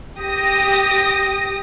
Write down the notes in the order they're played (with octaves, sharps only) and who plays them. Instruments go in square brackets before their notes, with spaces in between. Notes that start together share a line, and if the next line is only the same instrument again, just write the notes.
[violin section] G4 D#6 A#6